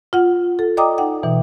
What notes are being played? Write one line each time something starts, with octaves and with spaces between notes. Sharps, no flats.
F4 F#5
A4
D5 D#5 G5 A#5 D6 D#6
D#4 F#5 G5
B2 E3